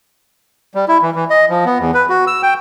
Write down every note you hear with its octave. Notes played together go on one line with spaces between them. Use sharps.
G3
E4
E3
E3
D#5
F3
B3
E2
B4
F#4
E6
G5